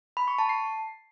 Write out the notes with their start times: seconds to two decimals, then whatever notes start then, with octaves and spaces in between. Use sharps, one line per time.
0.17 B5
0.28 C#6
0.38 A5
0.49 C7